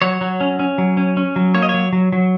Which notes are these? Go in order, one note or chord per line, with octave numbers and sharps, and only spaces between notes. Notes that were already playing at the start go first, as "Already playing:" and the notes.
F#3 C#5
F#3
C#4
C#4
F#3
C#4
C#4
F#3
A#3 C#5
D#5
F#3 C#5
F#3
F#3